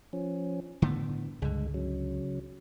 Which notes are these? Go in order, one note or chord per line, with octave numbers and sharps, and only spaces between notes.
F3 C#4
A2 D3 A3 B3
C#2 G2 D3 G#3
C#3 F#3